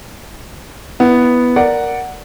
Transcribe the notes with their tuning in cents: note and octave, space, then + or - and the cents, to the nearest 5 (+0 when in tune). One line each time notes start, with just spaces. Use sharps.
B3 +0 E4 +0
A#4 +0 D5 +0 F#5 +0